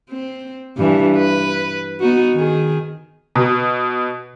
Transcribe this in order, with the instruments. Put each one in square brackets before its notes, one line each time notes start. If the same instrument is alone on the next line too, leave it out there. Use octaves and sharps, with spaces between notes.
[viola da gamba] C4
G2 E3
B4
B3 D#4 F#4
D#3 G#4
[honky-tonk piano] B2